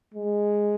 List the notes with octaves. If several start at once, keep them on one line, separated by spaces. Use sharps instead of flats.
G#3